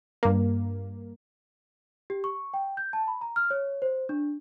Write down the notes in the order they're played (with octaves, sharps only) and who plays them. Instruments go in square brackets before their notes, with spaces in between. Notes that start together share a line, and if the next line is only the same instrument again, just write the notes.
[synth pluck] G2 A#3
[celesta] G4
C#6
G5
G6
A5
B5
A#5
F6
C#5
C5
D4